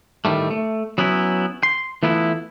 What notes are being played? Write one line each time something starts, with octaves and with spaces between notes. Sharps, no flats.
A2 D#3 F#3 G3 A3
A3
F#3 B3 C#4 E4
C6
E3 A3 B3 E4 F4